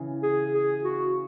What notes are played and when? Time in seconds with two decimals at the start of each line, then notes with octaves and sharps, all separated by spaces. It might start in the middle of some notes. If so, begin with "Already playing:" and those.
Already playing: C#3 E3
0.23 G#4
0.54 G#4
0.84 F#4